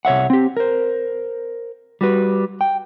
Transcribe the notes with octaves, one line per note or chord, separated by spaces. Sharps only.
C2 C#5 E5 F#5
C4 G4
A#4 C5
G3 F#4 B4
G5